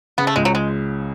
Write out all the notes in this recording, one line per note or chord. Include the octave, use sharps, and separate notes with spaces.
C#3 B3
A3
C#2 G#3
F#3
G#3